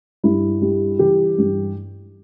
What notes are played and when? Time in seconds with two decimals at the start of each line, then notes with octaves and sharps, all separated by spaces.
0.24 G2 E4
0.62 G3
0.99 E3 G4
1.38 G2